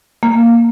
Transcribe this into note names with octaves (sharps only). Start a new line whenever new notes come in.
A#3